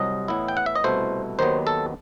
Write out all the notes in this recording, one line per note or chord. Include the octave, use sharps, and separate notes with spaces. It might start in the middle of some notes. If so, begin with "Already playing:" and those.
Already playing: C2 C3 F#3 D#5
A2 E3 B3 E4
G5
F#5
E5
D#5
C2 B2 A3 E4 C5
D#2 D#3 F#3 B3 C5
A4